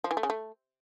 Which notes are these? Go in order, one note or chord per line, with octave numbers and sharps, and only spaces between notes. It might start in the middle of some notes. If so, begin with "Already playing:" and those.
F3
E3
A3
C#3
A3